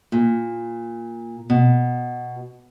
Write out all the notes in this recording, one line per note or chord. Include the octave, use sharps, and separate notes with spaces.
A#2
B2